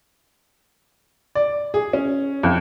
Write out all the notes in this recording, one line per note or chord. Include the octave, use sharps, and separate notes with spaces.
D5
G#4
C#4
F2